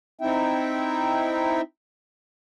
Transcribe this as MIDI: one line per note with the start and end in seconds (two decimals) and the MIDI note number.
0.21 1.61 60
0.21 1.61 63
0.21 1.61 64
0.21 1.61 76
0.21 1.61 79